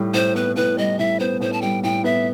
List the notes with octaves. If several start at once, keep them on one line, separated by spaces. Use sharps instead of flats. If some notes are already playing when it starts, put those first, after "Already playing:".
Already playing: A2 G3
A2 C5
B3 B4
A2 B4
G3 D#5
A2 E5
B3 C5
A2 C5
A5
G3 G5
A2 G5
B3 E5